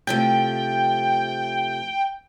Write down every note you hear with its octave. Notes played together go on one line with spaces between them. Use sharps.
C3 F3 A3 G5